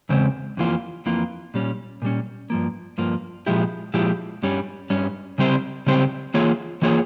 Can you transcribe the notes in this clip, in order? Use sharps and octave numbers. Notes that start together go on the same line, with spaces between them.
E2 C#3 G#3 C4
F2 E3 A#3 F4
F2 E3 A#3 F4
A#2 G3 C#4
A#2 G3 C#4
G2 F3 A#3
G2 F3 A#3
A#2 F3 G#3 E4 G4
A#2 F3 G#3 E4 G4
G2 G3 C#4
G2 G3 C#4
C#3 G3 C4 G4 C5
C#3 G3 C4 G4 C5
E3 A#3 F4 G#4 C#5
E3 A#3 F4 G#4 C#5